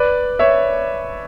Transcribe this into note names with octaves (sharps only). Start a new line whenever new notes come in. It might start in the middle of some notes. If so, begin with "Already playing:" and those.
Already playing: B4 D5
C#5 E5